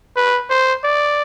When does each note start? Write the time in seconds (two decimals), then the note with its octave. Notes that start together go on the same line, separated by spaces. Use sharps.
0.16 B4
0.50 C5
0.84 D5